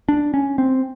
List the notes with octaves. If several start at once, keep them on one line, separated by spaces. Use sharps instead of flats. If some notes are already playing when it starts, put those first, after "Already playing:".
D4
C#4
C4